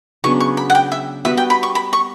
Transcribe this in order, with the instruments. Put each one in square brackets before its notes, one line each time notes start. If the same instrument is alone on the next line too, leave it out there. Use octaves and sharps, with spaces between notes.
[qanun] C#3 F#3 B3 D4 [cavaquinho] C#6
[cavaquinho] C#6
B5
F#5
G5
E5
[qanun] G3 B3 F#4 B4 [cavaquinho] E5
[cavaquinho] G5
B5
C#6
B5
C#6